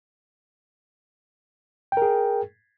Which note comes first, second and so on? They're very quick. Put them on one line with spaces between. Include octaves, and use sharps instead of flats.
G5 A#4 G#4